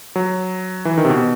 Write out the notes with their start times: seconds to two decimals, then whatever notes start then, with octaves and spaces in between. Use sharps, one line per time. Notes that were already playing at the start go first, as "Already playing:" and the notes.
0.16 F#3
0.85 E3
0.98 D#3
1.05 C3
1.09 B2